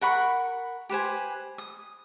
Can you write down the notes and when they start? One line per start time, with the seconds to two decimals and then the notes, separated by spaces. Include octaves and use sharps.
0.01 A#4 F#5 B5 C#6
0.89 G4 B4 C5 G#5
1.58 D#6